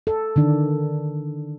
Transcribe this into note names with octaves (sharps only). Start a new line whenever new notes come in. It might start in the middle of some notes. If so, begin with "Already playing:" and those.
A4
D3 D#3 D4